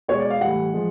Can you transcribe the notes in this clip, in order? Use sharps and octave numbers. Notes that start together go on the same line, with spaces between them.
B2 G#3 C#5
D5
F5
A2 E3 G3 F#5
F3 G#3